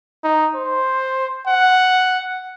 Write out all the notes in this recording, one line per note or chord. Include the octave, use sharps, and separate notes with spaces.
D#4
C5
F#5